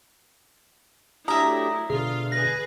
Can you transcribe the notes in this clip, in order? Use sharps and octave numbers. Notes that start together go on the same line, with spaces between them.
F#3 A3 D4 E4 G4 E5 A#5 D#6
B2 D3 F4 G#4 F5
G#4 B4 A#6